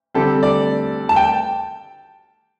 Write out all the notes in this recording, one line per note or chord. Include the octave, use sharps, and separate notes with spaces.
D3 G3 C4 A4
D5
A5
G5